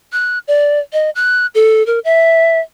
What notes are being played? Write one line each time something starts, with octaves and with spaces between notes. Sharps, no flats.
F#6
D5
D#5
F#6
A4
A#4
E5